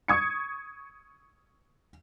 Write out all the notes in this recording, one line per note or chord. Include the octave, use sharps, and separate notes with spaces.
C#6 D#6 G#6 C#7